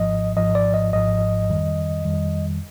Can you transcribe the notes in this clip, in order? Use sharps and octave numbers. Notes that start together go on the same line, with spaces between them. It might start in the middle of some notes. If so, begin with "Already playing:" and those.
Already playing: G#1 G#2 F3 D#5
G#1 G#2 F3 D#5
D5
D#5
G#1 G#2 F3 D#5
F2 D#3 G3
F2 D#3 G3